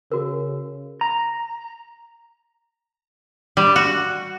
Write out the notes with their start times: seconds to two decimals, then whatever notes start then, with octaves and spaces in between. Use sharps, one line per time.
0.12 C#3 F#4 A#4
1.01 A#5
3.57 G3
3.76 F#4